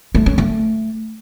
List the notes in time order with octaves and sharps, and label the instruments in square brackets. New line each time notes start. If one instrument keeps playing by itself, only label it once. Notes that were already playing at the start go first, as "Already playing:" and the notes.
[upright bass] A3
C#4
A3